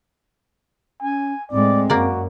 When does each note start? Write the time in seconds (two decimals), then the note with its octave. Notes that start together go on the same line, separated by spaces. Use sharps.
1.02 C#4 G#5
1.51 A2 G#3 C4 D5
1.90 F#2 A#3 F#4 D5